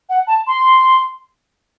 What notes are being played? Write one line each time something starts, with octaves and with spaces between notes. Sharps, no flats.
F#5
A5
C6